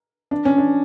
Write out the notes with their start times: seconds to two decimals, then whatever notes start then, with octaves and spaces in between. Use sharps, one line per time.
0.31 D4
0.45 C#4
0.58 D4